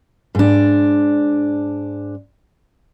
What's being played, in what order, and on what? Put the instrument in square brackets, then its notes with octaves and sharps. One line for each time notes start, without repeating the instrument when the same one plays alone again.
[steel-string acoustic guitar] G#2 D4